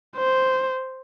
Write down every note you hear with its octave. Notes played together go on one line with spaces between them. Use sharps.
C5